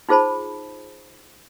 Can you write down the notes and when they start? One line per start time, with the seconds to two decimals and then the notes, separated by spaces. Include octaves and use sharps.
0.09 D#4 F4 G#4 C5 A5 B5